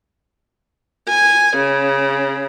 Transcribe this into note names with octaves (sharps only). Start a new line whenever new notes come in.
G#5
C#3